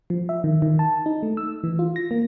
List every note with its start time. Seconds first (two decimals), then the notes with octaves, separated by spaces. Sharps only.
0.10 F3
0.29 E5
0.44 D#3
0.62 D#3
0.79 A5
1.06 D#4
1.23 A3
1.37 E6
1.64 E3
1.79 F4
1.96 A#6
2.11 A#3